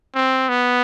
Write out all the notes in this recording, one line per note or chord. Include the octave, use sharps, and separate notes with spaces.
C4
B3